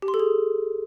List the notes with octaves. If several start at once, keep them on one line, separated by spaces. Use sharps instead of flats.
G4
C6
A4
G#4